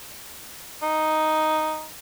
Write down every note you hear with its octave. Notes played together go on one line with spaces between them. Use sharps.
D#4